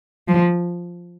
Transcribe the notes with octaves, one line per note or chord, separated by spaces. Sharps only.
F3